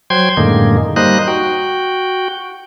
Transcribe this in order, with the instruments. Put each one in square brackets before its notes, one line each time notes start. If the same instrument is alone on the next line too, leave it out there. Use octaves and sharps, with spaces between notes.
[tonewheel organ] F#3 C5 G5 C6 G#6
F#2 A2 D3 D#3 G#3 A#3
G3 A#3 D#4 C5 D#5 F#6
F#4 G5